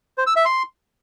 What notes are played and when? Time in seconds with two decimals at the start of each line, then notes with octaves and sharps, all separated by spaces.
0.18 C5
0.27 E6
0.36 E5
0.45 C6